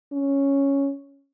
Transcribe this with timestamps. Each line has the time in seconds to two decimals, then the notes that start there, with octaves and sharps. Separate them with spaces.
0.12 C#4